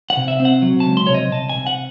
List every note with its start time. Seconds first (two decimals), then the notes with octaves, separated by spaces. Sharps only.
0.10 F#5
0.17 C3
0.28 E5
0.40 C4
0.45 F#5
0.62 F#3
0.80 A5
0.86 C#2
0.97 C6
1.07 C3 C#5
1.14 D#5
1.31 C2 A5
1.50 G#5
1.55 C3
1.67 F#5